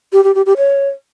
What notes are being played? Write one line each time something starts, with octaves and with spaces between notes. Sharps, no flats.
G4
G4
G4
G4
C#5